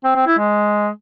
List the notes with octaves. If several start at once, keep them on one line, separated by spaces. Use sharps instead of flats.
C4
C4
E4
G#3